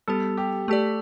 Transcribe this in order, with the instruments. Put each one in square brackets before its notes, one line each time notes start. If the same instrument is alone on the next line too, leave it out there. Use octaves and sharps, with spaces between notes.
[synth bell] G3 B3 G4 [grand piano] A4
[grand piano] G4
[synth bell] A3 G4 D5 [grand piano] A4